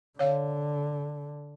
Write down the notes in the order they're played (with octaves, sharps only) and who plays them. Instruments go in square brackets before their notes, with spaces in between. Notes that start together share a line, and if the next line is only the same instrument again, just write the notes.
[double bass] D3 [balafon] C#5 F5